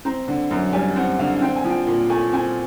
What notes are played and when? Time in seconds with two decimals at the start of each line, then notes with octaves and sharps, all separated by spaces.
0.05 C4 A#5
0.28 D3
0.51 F#2
0.73 G3 G#5
0.96 C4 F#5
1.19 D3 F5
1.42 C4 G5
1.56 G#5
1.64 F3
1.70 G5
1.86 A#2
2.09 A3 G#5
2.33 C4 G#5